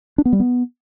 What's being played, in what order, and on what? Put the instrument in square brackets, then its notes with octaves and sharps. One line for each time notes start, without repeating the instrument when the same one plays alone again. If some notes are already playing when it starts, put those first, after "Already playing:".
[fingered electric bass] D4
B3
G3
B3